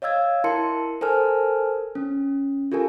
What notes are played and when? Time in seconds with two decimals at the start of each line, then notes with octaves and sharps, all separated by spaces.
0.02 C#5 D#5 F5 E6 G#6
0.44 E4 A#4 A5 C6 C#7
1.01 A4 A#4 C5 G#5 A5 F6
1.95 C#4
2.72 F4 G4 A4 A#4 G#5